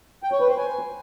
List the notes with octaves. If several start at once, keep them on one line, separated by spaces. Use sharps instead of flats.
G5
C#5
B4
C5
G#5